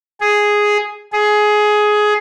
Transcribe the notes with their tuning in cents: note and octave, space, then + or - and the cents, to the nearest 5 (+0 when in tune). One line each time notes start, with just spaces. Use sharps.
G#4 +0
G#4 +15